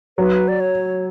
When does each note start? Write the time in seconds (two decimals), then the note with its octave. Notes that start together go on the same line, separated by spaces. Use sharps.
0.18 F#3 B4
0.48 D5
0.60 C#5